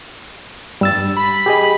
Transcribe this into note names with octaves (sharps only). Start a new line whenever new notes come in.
G2 G3 E6 A6
B5
G4 G#4 D#5